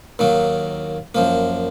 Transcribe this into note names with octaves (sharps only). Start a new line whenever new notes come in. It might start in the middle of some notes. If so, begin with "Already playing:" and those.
D#2 D#3 F#3 A#3
F#2 F3 A#3